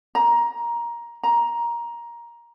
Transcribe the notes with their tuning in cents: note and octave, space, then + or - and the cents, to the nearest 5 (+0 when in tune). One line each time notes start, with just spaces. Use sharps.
A#5 +15
A#5 +15